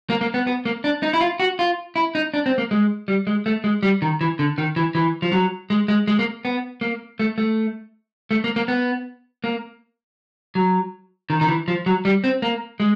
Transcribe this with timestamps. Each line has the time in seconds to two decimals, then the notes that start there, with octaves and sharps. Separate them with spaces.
0.10 A#3
0.21 A#3
0.34 B3
0.47 B3
0.65 A#3
0.84 D4
1.03 D#4
1.13 E4
1.21 F4
1.40 F#4
1.59 F4
1.96 E4
2.15 D#4
2.34 D4
2.46 C4
2.58 A#3
2.71 G#3
3.08 G3
3.27 G#3
3.46 A3
3.64 G#3
3.83 G3
4.02 D#3
4.21 E3
4.39 D3
4.58 D#3
4.76 E3
4.95 E3
5.22 F3
5.32 F#3
5.70 G#3
5.88 G#3
6.08 G#3
6.19 A#3
6.45 B3
6.81 A#3
7.20 A3
7.38 A3
8.31 A3
8.44 A#3
8.56 A#3
8.68 B3
9.44 A#3
10.55 F#3
11.30 D#3
11.41 D#3
11.49 E3
11.68 F3
11.86 F#3
12.05 G3
12.24 C4
12.42 A#3
12.80 G#3